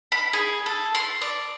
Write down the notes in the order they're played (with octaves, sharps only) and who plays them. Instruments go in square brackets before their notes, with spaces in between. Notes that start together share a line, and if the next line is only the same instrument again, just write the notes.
[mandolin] B5
G#4
A4
C6
D5